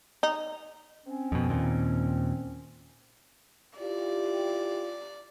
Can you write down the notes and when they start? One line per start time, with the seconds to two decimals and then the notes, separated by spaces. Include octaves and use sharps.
0.23 D#4
1.06 C4 C#4
1.32 F2 B2
1.49 D#2 A#2
3.78 E4 F4 G4 D5